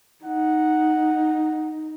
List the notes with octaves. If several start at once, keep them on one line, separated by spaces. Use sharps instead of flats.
D#4 F#5